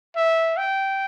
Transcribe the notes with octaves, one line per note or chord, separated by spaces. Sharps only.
E5
G5